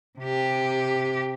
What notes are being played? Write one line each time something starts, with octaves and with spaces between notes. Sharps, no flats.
C3 G4